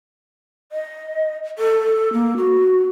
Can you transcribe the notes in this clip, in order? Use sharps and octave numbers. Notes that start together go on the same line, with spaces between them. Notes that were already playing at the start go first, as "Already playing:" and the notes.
D#5
A4
A#3
F#4